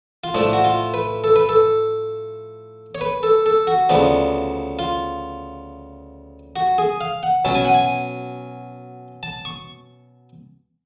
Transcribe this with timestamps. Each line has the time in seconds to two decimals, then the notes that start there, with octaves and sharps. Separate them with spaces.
0.24 F4
0.34 A2 F3 A3 D4
0.53 F#4
0.64 F4
0.94 B4
1.24 A4
1.36 B4
1.49 A4
2.95 C#5
3.01 B4
3.23 A4
3.46 A4
3.67 F#4
3.89 D2 C#3 F3 B3 D4
4.79 F4
6.56 F#4
6.78 G#4
7.01 F5
7.23 F#5
7.45 B2 F#3 C#4 A5
7.55 G#5
7.65 F#5
7.74 G#5
9.23 A5
9.45 C#6